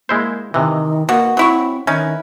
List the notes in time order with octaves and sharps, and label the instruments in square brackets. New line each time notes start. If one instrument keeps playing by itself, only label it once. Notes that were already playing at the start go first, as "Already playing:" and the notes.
[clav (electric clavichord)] G#3 E4 C5 [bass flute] A#3
[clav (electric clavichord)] C3 E3 [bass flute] D#3 [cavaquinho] D#5
[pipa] B2 [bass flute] A#3 [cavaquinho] F#4
[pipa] F#3 E4 C#6 [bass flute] C4
[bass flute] D#3 [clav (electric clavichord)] C#4 [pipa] D#4 [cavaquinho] E4 B4